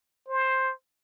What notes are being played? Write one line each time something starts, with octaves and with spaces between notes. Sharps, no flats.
C5